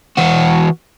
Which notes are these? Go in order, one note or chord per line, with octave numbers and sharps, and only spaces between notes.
E3 F#4